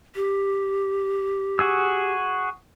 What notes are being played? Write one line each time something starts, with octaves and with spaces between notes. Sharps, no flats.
G4
F#4 G#4 E6